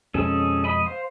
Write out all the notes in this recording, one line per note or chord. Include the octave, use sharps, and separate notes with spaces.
F2 B2 G#3 C#4 G#4 A4
D#5 B5
C5 F5